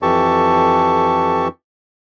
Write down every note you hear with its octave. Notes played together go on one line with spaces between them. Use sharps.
F2 E3 G4 A4 A5 C#6